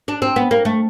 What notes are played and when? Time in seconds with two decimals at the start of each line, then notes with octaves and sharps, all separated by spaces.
0.08 D4
0.22 C4
0.36 B3
0.51 A#3
0.65 A3